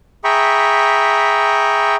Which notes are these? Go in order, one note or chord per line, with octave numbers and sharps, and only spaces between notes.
G#4 E5 G5 A#5 B5 C#6